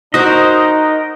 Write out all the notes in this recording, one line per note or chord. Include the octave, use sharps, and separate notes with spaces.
D#4 F#4 A#4 C5 D#5